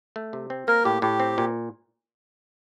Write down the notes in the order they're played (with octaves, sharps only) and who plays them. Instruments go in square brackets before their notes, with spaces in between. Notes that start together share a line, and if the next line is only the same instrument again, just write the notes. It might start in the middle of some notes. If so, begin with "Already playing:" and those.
[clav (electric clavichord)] A3
C3
C4
[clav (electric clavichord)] A#3 [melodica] A#4
[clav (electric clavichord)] A2 [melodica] G4
[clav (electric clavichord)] A2 [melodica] G4
[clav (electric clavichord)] C4
A#2